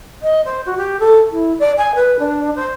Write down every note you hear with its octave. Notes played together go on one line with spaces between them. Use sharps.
D#5
C5
F#4
G4
A4
E4
D5
G#5
B4
D4
C5